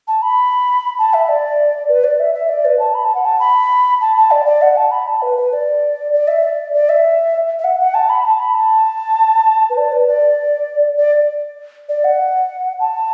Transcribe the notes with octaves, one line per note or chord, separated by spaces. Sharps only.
A5
B5
A5
E5
D5
B4
D5
E5
E5
D5
B4
A5
B5
A5
F#5
A5
B5
A5
A5
D5
D5
F#5
A5
B5
A5
B4
B4
D5
D5
E5
D5
D5
E5
E5
F#5
F#5
A5
B5
A5
B5
A5
B4
D5
B4
D5
D5
D5
F#5
A5